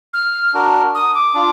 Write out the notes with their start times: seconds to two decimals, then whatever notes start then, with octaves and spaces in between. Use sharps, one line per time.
0.13 F6
0.54 D4 F#4 A#4
0.95 D#6
1.14 D6
1.34 D4 F4